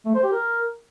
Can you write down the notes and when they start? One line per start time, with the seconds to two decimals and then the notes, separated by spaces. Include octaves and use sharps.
0.06 A3
0.15 C5
0.23 G4
0.32 A#4